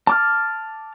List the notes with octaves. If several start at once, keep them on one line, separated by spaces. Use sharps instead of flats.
A5 D6 F6